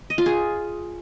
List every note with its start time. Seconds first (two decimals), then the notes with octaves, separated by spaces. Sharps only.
0.10 D#5
0.18 F4
0.26 G#4